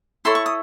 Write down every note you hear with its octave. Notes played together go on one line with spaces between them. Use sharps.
E4 A4 C#5 C6
C#6
D#6